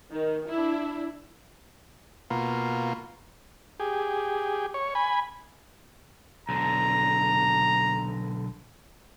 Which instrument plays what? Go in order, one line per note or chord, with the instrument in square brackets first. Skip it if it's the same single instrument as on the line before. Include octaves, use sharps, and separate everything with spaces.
[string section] D#3
D4 E4
[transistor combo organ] B2 A#3 F4
G4 G#4
C#5
G#5 B5
[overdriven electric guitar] B1 D3 [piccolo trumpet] A#5